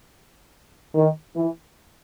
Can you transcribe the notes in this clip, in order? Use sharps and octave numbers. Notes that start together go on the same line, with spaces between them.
D#3
E3